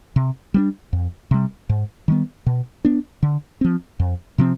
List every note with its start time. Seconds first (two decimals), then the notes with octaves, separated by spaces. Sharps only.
0.16 C3
0.54 G3 B3 D4
0.93 F2
1.31 C3 G3
1.69 G#2
2.08 D#3 G3 B3
2.46 B2
2.85 B3 D4
3.23 D3
3.61 F3 C4
4.00 F2
4.38 C3 F3 C4